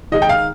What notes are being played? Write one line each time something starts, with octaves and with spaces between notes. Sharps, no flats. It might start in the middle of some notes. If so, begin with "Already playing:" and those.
D#3 G#3 D#4 D#5
G5
F5